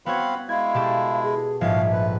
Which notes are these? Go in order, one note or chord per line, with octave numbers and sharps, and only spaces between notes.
B3 C4 F#4 C#5 F5 B5
G#3 E4 F5 G#6
B2 G4 A4
G#4
A#1 G#2 B2 G#3 E5 F5
F2 B4